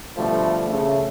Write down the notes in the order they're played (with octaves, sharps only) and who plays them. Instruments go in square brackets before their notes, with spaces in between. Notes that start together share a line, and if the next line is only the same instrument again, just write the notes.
[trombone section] B2 D3 F3 G3 A3
C#3 A3